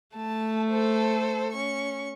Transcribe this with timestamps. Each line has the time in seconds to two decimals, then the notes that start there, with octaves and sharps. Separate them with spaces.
0.16 A3 A5
0.70 A4 C5
1.52 C#4 C#6